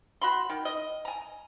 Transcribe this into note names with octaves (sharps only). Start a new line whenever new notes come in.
F#4 B5 C6
D#3
D#5
G#5 A#5